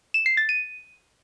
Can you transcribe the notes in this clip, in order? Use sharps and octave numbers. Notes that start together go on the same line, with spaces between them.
E7
C7
A6
D#7